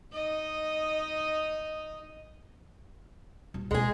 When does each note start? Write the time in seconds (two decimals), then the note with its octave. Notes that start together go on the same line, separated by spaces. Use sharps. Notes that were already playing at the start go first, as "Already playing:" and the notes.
0.12 D#4 D#5
3.54 D#1
3.71 D#2 B2 G#3 G#4